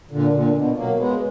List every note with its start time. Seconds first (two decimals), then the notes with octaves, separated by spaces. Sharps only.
0.11 A#2 D3
0.33 A#2 D3
0.55 B2
0.77 F#3 A#3
0.99 G#3 B3